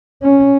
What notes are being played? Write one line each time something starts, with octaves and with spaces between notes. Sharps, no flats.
C#4